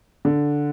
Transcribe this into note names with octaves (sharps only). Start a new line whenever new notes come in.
D3